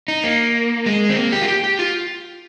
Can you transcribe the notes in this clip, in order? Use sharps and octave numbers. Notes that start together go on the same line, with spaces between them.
D#4
A#3
G#3
C4
A#3
G4
F4
G4
G4
F4